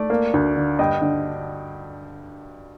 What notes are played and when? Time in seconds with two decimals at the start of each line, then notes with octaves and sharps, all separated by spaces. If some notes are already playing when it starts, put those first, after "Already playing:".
Already playing: A3 D5
0.10 A#3
0.34 D2
0.56 D3
0.79 G2 D#5 G5
1.02 D3